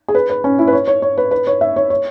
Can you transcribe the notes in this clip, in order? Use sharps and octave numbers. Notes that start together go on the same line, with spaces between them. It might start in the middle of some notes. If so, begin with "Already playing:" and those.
G#4
B4
B4
C#4
E4
B4
C#5
C#5
C#5
B4
B4
C#5
E5
C#5
C#5